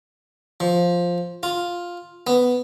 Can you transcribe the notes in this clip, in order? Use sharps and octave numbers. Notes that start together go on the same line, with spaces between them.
F3
F4
B3